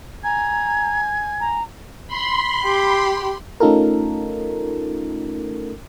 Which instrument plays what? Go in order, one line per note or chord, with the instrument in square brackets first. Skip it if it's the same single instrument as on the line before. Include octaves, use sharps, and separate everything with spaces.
[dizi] G#5 [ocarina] A#5 [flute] G#6
[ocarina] A#5
[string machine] B5 C6
[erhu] G4
[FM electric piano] A3 C#4 D#4 F4 A4 A#4